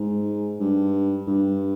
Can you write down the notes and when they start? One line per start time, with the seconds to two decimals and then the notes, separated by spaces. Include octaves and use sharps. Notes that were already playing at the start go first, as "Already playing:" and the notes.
Already playing: G#2
0.60 G2
1.27 G2